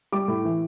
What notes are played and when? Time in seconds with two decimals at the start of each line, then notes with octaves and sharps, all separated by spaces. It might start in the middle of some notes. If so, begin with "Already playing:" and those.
0.12 G3 D6
0.28 A2
0.45 E3